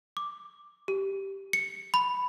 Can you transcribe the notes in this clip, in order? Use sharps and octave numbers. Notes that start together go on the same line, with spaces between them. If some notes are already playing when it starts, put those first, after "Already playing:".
D6
G4
C#7
B5